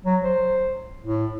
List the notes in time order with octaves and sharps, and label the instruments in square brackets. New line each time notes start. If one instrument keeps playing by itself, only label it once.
[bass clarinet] F#3
C5
A2